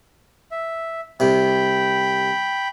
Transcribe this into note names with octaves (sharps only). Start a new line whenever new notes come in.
E5
C2 C3 G5 B5